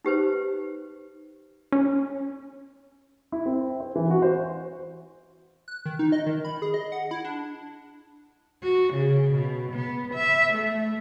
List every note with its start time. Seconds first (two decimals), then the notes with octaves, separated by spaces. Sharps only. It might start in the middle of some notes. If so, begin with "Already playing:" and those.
0.05 D#4 G4 B4 C5
1.73 C#4
3.32 E4
3.46 C4
3.80 C5
3.95 E3
4.11 F#4
4.22 C5
5.68 F#6
5.86 D#3
5.99 D#4
6.12 D#5
6.27 D#3
6.45 B5
6.62 G#4
6.74 D#5
6.92 F#5
7.11 E4
7.25 D4
8.63 F#4
8.93 C#3
9.34 B2
9.72 B3
10.14 E5
10.53 A3